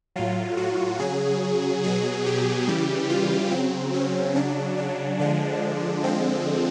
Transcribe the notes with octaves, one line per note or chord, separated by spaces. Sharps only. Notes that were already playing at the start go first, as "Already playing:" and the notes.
A2 F#3 F4
F#4
C#3 F#3 G#4
B2 F#3 G#4
G4
C#3 E3 G3
F4
C#3 F#3 C4
C#4
C#3 F#3 D4
D4
D3 F3 G#3 D4
D3 F3 G#3 C4